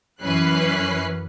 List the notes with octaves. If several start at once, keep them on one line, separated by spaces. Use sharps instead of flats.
F#2 E3 C#4 B4 F#6 C7